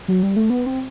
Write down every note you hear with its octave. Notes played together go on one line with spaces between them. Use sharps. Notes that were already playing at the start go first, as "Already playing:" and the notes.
F#3
G3
A3
B3
C4